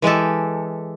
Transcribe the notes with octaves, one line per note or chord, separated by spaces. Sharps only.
E3 G#3 G4 A4